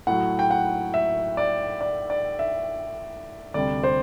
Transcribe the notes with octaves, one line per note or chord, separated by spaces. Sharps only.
A2 F#3 F#5
G5
F#5
E5
D5
D5
D5
E5
D2 C3 G3 D5
C5